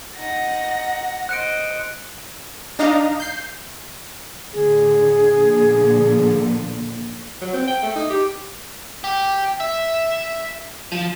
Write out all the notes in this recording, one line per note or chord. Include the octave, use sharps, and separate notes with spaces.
D#4 F#5 A#6
C5 D#5 F#6 C#7 D7
D4 D#4 D#5 F5 A#5
G6 C7
A2 D3 G#4
A#2 D3 F3
F#3
C4
G5
A3
D#4
G4
G4
E5
F3